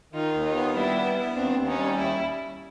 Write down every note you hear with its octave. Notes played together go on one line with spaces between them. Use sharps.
D#3 D#4 F4
D#2
D#4 F4
B3
G3 D4 E4
B3
B3
D#2 C4 D4
D#2
C#4 D#4
G3
D#2 E4